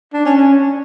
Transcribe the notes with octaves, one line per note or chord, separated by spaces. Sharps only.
D4
C#4
C#4